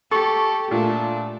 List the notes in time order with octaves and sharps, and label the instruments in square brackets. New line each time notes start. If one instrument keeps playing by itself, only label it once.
[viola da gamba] G4 [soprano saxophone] A4 [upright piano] C#6
[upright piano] A#2 [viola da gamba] A3 [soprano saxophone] D4